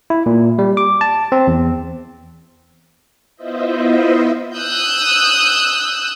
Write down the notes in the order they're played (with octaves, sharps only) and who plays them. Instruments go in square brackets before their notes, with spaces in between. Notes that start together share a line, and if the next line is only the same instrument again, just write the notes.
[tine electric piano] E4
A#2
G3
D6
A5
C4
E2
[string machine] B3 E4 F4 C5 D#5 E5
[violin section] D#6 E6 F#6 G6